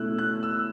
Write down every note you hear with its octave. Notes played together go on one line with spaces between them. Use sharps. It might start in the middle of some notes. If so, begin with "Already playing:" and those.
Already playing: B2 A3 C#4 E4 E6 F#6
F#6
E6